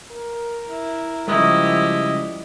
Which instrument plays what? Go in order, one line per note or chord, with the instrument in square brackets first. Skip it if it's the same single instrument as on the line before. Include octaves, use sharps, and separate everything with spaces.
[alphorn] A#4
[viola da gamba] E4
[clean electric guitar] C#3 G3 G#3 [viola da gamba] F3 G4 [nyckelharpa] E4 D#5